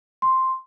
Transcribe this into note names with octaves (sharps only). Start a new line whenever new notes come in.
C6